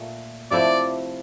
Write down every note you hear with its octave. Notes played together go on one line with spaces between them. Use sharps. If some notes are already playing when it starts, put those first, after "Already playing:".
Already playing: A#2 A3
C3 F3 A3 E4 D5